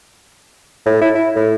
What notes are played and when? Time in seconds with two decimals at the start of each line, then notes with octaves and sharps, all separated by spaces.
0.86 A2
1.01 E4
1.15 E4
1.36 A2